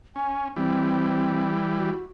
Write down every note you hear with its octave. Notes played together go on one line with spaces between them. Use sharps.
C#4 G#5
E3 G3 C4
F#4